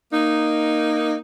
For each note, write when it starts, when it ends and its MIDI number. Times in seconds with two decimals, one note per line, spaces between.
0.12 1.17 58
0.12 1.17 63